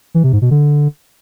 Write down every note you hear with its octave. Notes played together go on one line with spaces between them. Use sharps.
E3
C3
G#2
B2
D3